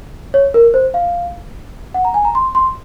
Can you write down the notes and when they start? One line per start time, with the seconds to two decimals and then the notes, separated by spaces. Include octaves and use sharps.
0.34 C#5
0.54 A#4
0.74 C5
0.94 F5
1.94 F#5
2.05 A#5
2.14 G#5
2.25 A#5
2.35 C6
2.55 C6